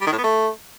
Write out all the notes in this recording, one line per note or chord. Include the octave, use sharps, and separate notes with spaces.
G3
D#3
A2
B3
A3